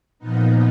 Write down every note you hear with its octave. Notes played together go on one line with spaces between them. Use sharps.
A#2 F3 B3 D#4